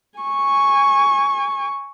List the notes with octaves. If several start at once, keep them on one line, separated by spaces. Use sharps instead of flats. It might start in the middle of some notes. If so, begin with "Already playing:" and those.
G#5 C#6